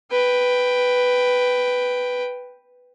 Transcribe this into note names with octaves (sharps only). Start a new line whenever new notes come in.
B4 G5